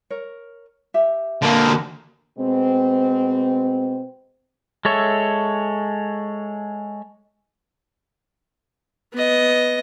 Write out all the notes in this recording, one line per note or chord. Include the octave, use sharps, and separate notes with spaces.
A#4 C#5
G4 E5
D3 A#3
F#5 A5
B2 G#3 C4
G#3 A4 C#5 E5
B3 D#5